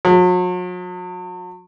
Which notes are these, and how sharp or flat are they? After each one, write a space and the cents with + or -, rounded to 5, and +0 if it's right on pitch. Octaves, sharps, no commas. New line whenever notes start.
F#3 -40